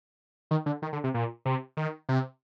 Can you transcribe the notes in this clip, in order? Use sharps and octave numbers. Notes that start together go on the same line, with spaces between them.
D#3
D3
D#3
D3
C3
A#2
C3
D#3
C3